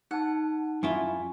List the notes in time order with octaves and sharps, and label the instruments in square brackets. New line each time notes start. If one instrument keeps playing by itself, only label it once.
[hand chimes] D#4 A5 [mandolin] F#5
[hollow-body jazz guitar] F#2 E4 F4 [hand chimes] G#5 C#6